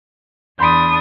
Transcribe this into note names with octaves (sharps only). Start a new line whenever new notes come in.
E2 D4 B5 C6 D#6 G6